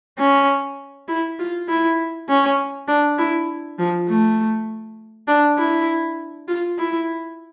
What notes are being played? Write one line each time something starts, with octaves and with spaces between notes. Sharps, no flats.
C#4
E4
F4
E4
C#4
D4
E4
F3
A3
D4
E4
F4
E4